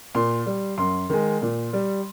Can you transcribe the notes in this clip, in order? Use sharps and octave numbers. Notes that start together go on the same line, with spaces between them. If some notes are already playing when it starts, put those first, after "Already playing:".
A#2 C6
G3
F#2 C6
D#3 G#3
A#2
G3